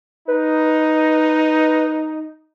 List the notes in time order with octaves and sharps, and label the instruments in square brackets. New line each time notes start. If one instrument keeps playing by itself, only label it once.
[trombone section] D#4 [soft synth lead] B4